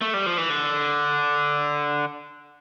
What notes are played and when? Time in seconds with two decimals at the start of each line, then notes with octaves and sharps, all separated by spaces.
0.01 A3
0.14 G3
0.26 F3
0.38 E3
0.50 D3